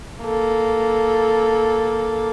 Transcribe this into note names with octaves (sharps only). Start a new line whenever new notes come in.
A#3 A4